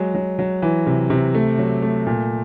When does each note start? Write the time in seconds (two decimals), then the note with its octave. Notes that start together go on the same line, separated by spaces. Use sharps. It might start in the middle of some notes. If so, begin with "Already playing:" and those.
Already playing: F#3 G#3
0.15 F#3
0.39 F#3
0.62 E3
0.87 C3
1.10 C3
1.35 A3
1.59 F#3
1.82 A3
2.06 A#2